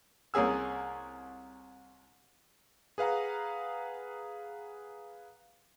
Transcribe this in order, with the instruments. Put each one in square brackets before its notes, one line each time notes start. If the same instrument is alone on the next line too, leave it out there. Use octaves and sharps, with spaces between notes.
[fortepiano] C2 A#3 C#4 G#4 E6
[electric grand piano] G#4 B4 F5 F#5 A#5